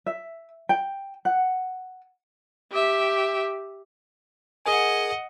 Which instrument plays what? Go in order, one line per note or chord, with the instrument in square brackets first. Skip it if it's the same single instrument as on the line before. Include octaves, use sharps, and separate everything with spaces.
[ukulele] E5
G5
F#5
[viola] G4 E5
[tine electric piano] G#4 A#4 G#5 [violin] D#5 F#5